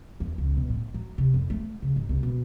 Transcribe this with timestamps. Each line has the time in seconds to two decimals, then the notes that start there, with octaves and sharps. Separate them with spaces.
0.20 E2
0.38 C#2
0.57 B2
0.70 A2
0.94 F#3
1.18 C3
1.34 F2
1.50 A3
1.82 C#3
1.96 G#2
2.09 C2
2.23 B2